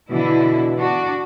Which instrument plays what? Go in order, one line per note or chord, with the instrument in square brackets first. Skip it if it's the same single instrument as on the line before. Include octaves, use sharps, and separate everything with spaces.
[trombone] B2 [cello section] D3 E3 E4
[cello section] D4 F#4